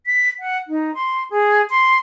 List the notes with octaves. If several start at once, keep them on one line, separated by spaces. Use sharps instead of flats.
B6
F#5
D#4
C6
G#4
C6